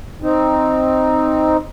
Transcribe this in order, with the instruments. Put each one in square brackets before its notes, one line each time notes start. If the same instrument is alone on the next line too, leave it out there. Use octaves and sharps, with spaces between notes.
[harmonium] C4 D#4